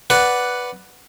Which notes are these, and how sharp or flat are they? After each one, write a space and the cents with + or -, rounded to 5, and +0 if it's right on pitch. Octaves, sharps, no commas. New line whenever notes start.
B4 +0 D5 -5 F#5 +0